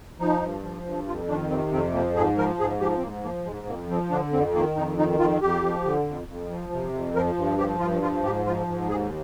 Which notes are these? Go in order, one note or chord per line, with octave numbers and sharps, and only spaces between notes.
F3 D#4
G2
F3
G2
F2 F4
D#3 D4
C3 C4
F2 C4
F3 A#3
G#2 G#4
F3 A#4
G#2 G#4
F3 G4
C4
G#2 A#3
F3 A#3
G#2 G#3
F2 A#3
F3 C4
D3 D4
F2 C4
D#3 A#3
F2 D#4
D#3 D#4
F2 F4
F2 G4
F3
D3
F2
F2
F3
C3
F2
F3 A#4
G2
F3 G4
G2 F4
F3 F4
G#2 G4
F3 F4
G#2
D#2 G#4